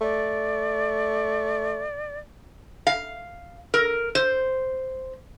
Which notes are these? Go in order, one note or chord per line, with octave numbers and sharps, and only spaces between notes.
A3 D5
F5
A#4
C5